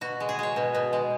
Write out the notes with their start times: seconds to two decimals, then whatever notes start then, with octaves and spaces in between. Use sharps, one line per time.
0.01 B2 F#4
0.20 G#3
0.29 G#4
0.39 G#3 C#5
0.56 B2
0.75 B2
0.93 G#3